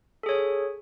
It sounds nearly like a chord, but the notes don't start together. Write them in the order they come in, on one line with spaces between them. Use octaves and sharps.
A4 G#4 C#5